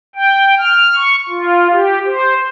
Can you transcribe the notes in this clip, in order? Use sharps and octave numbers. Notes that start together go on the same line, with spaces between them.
G5
F6
C#6
F4
G4
C5